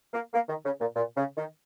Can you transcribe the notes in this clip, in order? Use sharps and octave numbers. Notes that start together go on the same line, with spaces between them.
A#3
A#3
D#3
C#3
A#2
A#2
C#3
D#3